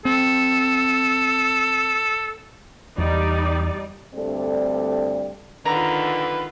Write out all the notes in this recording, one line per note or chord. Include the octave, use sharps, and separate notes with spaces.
C4 A4
E2 G3 D#4 D5
D2 G2 C4 A4 D5
D3 D#3 F4 B4 A#5